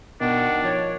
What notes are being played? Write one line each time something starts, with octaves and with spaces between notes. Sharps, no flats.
B2 D#3 D4 F#5
F3 C#5